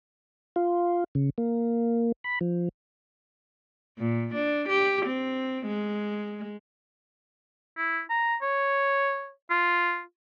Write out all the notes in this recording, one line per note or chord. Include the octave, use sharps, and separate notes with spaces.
F4
C#3
A#3
B5
F3
A#2
D4
G4
C4
G#3
E4
A#5
C#5
F4